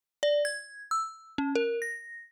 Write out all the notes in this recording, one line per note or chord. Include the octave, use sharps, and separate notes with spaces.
D5
G#6
E6
C#4
A#4
A#6